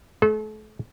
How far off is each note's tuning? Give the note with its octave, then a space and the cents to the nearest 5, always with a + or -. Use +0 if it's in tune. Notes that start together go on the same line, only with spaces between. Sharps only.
A3 -35 A4 -40